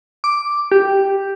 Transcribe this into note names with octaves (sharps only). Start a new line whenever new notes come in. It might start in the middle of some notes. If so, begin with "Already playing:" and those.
D6
G4